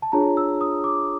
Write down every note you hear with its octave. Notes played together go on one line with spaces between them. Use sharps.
A5
D4 F4 G#4 C#5 A#5
E6
D#6
D6